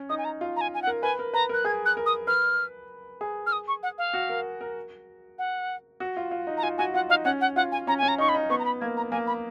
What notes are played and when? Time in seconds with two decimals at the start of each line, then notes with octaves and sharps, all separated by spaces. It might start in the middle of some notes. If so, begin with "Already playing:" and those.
Already playing: C#4
0.09 D#4 D#6
0.18 G#5
0.25 A#5
0.41 F4
0.56 A#5
0.61 G#5
0.74 G#5
0.82 F#5
0.87 A#4
1.02 B4 G#5
1.19 A#4
1.33 B4 A#5
1.49 A#4 F#6
1.65 G#4 G#6
1.86 F#6
1.97 A#4
2.06 D#6
2.27 B4 F6
3.21 G#4
3.46 F6
3.52 D#6
3.68 C#6
3.83 F#5
3.98 F5
4.13 F#4
4.29 A#4
4.61 A#4
5.39 F#5
6.00 F#4
6.17 F4
6.31 F4
6.47 D#4
6.57 A#5
6.63 F4 G#5
6.78 F#4 G#5
6.94 F4 F#5
7.09 D#4 F5
7.25 C#4 F#5
7.41 F#5
7.56 F4 F#5
7.72 G#5
7.87 C#4 A#5
7.98 C#4 G#5
8.08 A#5
8.18 D#4 C#6
8.29 B5
8.35 D#4
8.50 B3 C#6
8.59 A#5
8.65 B5
8.81 A#3 G#6
8.97 A#5
9.11 A#3 G#5
9.27 B5